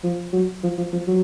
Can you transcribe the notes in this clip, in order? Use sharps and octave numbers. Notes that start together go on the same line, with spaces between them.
F3
F#3
F3
F3
F3
F#3